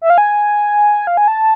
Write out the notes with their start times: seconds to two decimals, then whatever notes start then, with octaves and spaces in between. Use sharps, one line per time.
0.01 E5
0.10 F5
0.18 G#5
1.07 F5
1.17 G#5
1.28 A5